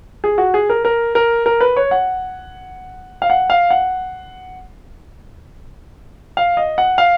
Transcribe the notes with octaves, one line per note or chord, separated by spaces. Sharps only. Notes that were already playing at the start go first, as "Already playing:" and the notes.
G#4
F#4
G#4
A#4
A#4
A#4
A#4
B4
C#5
F#5
F5
F#5
F5
F#5
F5
D#5
F#5
F5